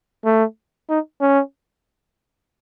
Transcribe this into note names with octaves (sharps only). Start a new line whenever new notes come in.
A3
D#4
C#4